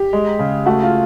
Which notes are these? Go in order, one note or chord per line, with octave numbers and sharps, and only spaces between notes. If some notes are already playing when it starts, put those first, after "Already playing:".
Already playing: G4
G#3
C#3
A3 F#4
F4